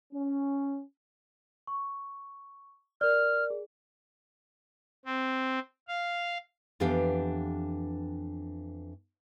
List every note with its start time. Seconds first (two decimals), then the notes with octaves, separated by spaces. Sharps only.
0.12 C#4
1.67 C#6
3.01 A#4 D5 F6
3.50 G#4
5.05 C4
5.88 F5
6.80 F2 E3 B3 D4 G4 F5